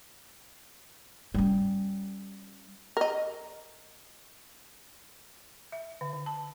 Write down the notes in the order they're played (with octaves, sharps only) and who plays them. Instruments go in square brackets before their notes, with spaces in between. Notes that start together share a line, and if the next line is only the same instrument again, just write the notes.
[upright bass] G3 C#4
[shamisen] A#4 D#5
[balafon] E5
D3
D3
A5